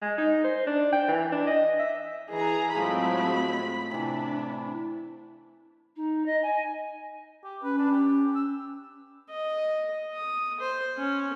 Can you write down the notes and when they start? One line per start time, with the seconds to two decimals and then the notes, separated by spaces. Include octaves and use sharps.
0.02 G#3
0.18 D#4
0.44 C5
0.67 D4
0.93 G5
1.08 E3
1.32 D4
1.47 D#5
1.80 E5
2.31 E3 G#4 A#5
2.75 A2 F3 F#3 G#3 A3 C4 B5
3.91 C3 E3 D4
5.96 D#4
6.25 D#5
6.42 G#5
7.44 G4
7.63 C#4 B4
7.78 D4
7.92 G4
8.35 E6
9.30 D#5
10.13 D#6
10.60 C5
10.98 C#4